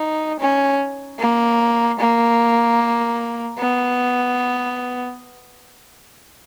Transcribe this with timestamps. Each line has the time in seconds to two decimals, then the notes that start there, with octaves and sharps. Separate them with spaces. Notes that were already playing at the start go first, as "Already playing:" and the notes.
Already playing: D#4
0.40 C#4
1.19 A#3
1.99 A#3
3.58 B3